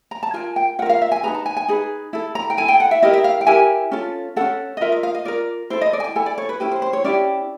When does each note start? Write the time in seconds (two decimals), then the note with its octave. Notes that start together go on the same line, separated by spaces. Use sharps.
0.11 A#5
0.23 A5
0.34 F4 A#4 G#5
0.56 G5
0.79 F4 F#5
0.82 A#4 E5
0.89 F5
1.02 E5
1.12 G#5
1.23 D#4 G#4 B4 A#5
1.35 A5
1.46 G#5
1.57 G#5
1.68 D#4 G#4 B4
2.13 E4 A4
2.35 A#5
2.50 G5
2.57 E4 A4 G#5
2.68 G5
2.80 F#5
2.91 E5
3.02 E4 G4 A#4 D#5
3.13 E5
3.24 F5
3.41 G5
3.47 E4 G4 A#4 G#5
3.91 C#4 F4 A4
4.36 C#4 F4 A4 F#5
4.77 D#5
4.81 F4 A#4 E5
4.92 D#5
5.03 F5
5.14 D#5
5.25 F4 A#4 D5
5.70 E4 A4 C5
5.81 D#5
5.93 D5
6.00 G#5
6.04 G5
6.16 E4 A4 G#5
6.26 D5
6.38 C#5
6.49 B4
6.60 C#4 E4 G4 B4
6.72 C5
6.82 C5
6.93 C#5
7.04 C#4 E4 G4 D5